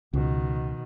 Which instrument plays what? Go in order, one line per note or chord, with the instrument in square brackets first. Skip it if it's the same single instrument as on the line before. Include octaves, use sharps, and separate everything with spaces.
[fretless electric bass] C#2 [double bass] B2 D#3